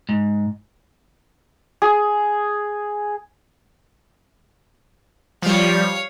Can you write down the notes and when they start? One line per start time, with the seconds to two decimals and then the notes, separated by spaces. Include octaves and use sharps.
0.09 G#2
1.82 G#4
5.42 F3 G3 C#5 F5